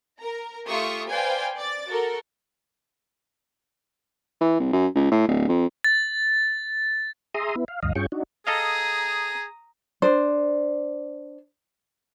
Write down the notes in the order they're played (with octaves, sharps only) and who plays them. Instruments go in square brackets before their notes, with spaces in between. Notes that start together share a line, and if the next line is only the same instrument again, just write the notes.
[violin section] A#4 A#5
A3 F4 G4 E5 C#6 D#6
B4 C5 D5 F5 G5 G#5
D5 D6 A6
F#4 A4 A#4
[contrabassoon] E3
C2
F#2
C#2
A2
D1
F2
[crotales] A6
[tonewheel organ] G#4 E5 A#5 C6 D#6
B3 E4
F5
D2 G2 D#5 F5
G2 C#4 F4 G#4 G5 C#6
D4 D#4 F#4
[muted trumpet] G#4 [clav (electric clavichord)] A4 D#5 F5 [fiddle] A#5 D#6
[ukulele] D4 C5